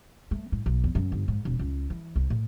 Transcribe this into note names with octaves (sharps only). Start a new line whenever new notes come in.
A3
A2
B1
E2
F#2
G1
G#2
E1
C#2
E3
C2
A2